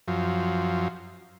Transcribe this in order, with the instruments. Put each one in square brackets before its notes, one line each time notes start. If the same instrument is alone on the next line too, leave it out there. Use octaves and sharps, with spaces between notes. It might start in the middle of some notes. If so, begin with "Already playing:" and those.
[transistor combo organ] F#2 F3